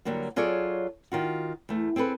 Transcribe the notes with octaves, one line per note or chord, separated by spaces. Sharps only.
D3 F#3 G3 A#3 D4
F#3 F4 G#4 A4 C#5 D5
D#3 F4 F#4
E2 A3
C4 G#4 A4 B4